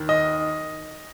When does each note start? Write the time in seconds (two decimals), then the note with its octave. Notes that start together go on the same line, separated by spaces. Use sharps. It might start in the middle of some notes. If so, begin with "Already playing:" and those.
Already playing: D#2 D#3
0.09 D#5